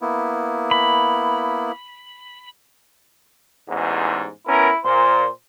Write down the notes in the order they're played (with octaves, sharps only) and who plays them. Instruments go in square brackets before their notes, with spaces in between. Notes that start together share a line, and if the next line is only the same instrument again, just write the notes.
[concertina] A#3 B3 E4
[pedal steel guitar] B5
[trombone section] A1 E2 G#2
[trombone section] B3 C#4 A#4 [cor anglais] E4
[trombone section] A#2 [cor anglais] C5